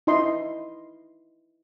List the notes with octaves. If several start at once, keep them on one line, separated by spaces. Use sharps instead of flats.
D#4 E4 D#5 C6